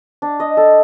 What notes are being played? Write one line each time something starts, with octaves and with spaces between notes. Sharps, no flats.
D4
D#5
A4